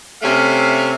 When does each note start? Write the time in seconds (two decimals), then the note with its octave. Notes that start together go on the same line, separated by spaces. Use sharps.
0.22 C3 A3 C#4 E5 F5